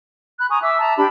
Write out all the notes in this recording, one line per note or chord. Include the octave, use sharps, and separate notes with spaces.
B5 F#6
G#5 A#5 C#6 D#6
E5 D6 E6
A5 A#5
D4 G4 B5